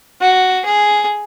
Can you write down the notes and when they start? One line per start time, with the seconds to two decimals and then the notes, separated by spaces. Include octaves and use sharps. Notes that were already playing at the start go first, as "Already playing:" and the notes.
0.21 F#4
0.65 G#4